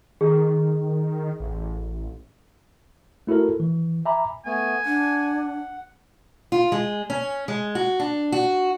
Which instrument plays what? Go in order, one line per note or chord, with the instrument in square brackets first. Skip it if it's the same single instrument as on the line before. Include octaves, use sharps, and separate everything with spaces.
[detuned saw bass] D#3 [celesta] G#4
[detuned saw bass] A1
[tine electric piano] A3 E4 F#4 A4 A#4
E3
E5 G#5 A#5 B5 D6
[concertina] A3 B3 [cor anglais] G#5
[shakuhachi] D4 [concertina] F#5
[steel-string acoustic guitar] F4
G#3
C#4
G#3
F#4
D4
F#4